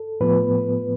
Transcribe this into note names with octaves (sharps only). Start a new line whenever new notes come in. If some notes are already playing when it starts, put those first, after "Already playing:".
Already playing: A4
A2 F3 B3 B4